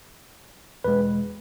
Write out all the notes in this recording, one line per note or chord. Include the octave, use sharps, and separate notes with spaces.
E2 B2 G#3 B4